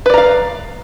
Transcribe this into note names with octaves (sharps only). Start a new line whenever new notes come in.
B4 D5 F5 A#5